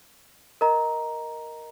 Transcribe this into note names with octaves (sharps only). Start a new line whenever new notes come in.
A#4 D#5 A#5